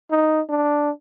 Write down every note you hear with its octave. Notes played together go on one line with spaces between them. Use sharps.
D#4
D4